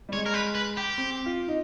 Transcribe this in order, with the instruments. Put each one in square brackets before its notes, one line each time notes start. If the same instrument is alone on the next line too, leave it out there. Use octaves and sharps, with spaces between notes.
[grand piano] G3
[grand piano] G#3 [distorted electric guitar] C#5
[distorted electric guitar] A#4
B4
B4
G4
[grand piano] C4
F4
D#4